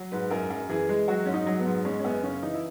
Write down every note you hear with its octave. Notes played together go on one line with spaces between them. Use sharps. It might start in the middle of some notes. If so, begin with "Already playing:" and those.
Already playing: F#3
G#2 B4
F#2 A#4
F#2
E3 G#4
G#3
F#3 F#4
G#2 C#4
D#4
F#3
B3
G#2
G#3 C#4
C#4
F#2 B3
C#3 C#4
E3 D#4
E4